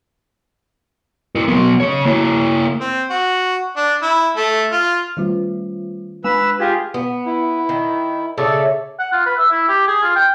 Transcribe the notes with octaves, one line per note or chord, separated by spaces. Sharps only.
E4 A#4
F#3 B3
C#3 C#5
A#3 E4
C4
F#4
D4
E4
A3
F4
D#3 G3 F4
G#3 B4 G#5 E6
F4 G4 G#4 F5 G#6
B3
E4
D#3
C#3 A3 A4 C#5 D5 E5
F#5
F4
B4
E5
E4
G4
G#4
F4
G5